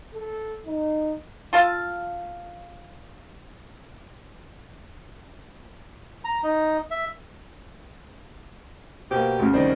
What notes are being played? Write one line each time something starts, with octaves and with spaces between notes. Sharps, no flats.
A4
D#4
F4 A4 F5
A#5
D#4
E5
B2 A#3 G4 C5
D2 C#3
C2 D#3 C5 D5 D#5